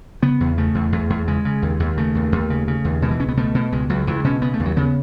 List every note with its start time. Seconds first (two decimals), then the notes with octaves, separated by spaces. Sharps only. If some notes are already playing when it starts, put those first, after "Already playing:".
0.22 C#3 B3
0.40 E2
0.57 C#3 A3
0.75 E2
0.92 E2
1.10 E2
1.27 C#3 G#3
1.45 C#3
1.62 D#2
1.80 D#2
1.97 C#3 A3
2.15 D#2
2.32 D#2
2.50 C#3
2.68 C#3
2.85 D#2
3.02 B2 G#3
3.11 E3
3.20 C#2 C#4
3.29 B3
3.37 B2 A3
3.55 B2
3.72 C#2 G#3
3.89 C#2 F#3
4.07 C#2 E3
4.25 B2 C#4
4.42 C#3 B3
4.54 A3
4.60 D#2
4.65 F#3
4.77 C#3 B3